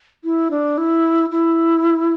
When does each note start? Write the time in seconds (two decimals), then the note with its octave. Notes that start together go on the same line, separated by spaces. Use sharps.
0.24 E4
0.51 D4
0.78 E4
1.31 E4